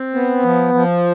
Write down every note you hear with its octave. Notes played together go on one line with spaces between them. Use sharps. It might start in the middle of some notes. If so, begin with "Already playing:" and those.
Already playing: C4
B3
F3
F3